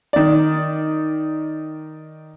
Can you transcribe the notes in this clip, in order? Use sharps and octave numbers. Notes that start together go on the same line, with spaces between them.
D#3 D5